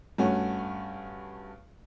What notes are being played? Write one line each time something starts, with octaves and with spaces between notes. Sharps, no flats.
G2 A3 C#4 F#4